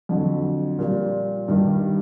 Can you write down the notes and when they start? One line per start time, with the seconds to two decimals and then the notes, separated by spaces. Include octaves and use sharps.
0.09 F2 D3 F#3
0.79 A#2 G3
1.48 G2 D#3 G3